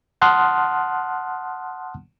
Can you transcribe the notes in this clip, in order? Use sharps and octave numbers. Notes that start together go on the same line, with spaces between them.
F#5 A5 C6 D#6 F6 F#6